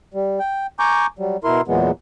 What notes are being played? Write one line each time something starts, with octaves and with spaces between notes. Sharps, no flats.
G3
G5
G#5 A#5 C#6 D6 G6
F#3 G3
B2 E4 A#4 C6
E2 A#2 E3 F#3 G#3 B3